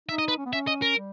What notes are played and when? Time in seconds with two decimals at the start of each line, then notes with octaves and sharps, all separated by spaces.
0.08 D#4 E5
0.18 D#5
0.28 B4
0.38 C#4
0.46 B3
0.53 C#4 E5
0.67 D#5
0.82 A#4
0.97 G3